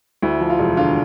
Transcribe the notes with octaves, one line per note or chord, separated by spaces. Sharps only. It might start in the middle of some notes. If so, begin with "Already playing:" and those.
D2 E4
F3
F4
E1
D3 F4